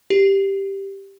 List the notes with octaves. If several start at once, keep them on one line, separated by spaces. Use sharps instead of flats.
G4